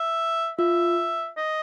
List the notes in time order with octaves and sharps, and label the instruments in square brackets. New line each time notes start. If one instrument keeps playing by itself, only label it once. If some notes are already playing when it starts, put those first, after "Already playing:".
Already playing: [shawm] E5
[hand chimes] F4 [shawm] E5
[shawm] D#5